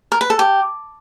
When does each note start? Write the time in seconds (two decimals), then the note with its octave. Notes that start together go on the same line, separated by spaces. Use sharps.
0.12 A#4
0.21 B4
0.30 A4
0.39 G4